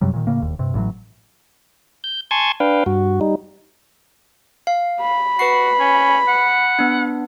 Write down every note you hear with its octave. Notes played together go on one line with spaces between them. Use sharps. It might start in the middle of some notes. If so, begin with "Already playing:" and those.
F#2 C3 F#3 G3
A#2 D#3
A2 C#3 A#3
E1 D#2
G2 C3
A1 A2 F#3
G6
G#5 A5 C6 C#6 G#6
D4 B4 F5 G5
G2 F#4
G3 D#4
F5
B5
F#4 B4 C7
C#4
F#5
B3 D4